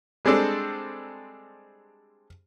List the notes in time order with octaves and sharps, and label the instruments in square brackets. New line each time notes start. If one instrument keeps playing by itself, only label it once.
[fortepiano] G3 G#3 C4 D4 A4